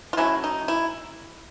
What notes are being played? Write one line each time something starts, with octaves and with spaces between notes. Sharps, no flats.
F4
F#3 A3 C#4 E4
D#4
E4